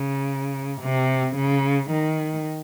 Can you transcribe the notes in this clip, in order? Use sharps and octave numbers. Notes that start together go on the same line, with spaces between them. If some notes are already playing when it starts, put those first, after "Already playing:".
Already playing: C#3
C3
C#3
D#3